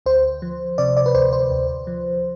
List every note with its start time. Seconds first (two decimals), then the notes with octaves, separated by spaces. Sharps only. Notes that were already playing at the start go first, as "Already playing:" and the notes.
0.06 D2 C5
0.42 F3
0.78 C3 D5
0.97 D5
1.06 B4
1.14 D2 C5
1.33 C5
1.51 D2
1.87 F3